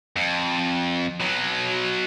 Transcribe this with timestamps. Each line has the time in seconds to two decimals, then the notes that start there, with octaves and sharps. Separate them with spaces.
0.16 F2
1.20 B2 F#3